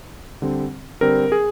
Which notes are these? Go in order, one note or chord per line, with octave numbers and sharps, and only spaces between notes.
D3 G3 C4
D3 G3 C4 A#4
G#4